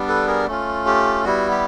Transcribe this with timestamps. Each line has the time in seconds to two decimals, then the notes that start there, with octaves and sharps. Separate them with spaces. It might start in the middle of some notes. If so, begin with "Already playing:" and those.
Already playing: G3 B3 D4
0.08 A4 B4
0.27 G#4 A#4
0.48 A3 C#4 F4
0.86 G4
1.24 G3 B3 E4 F#4
1.51 G4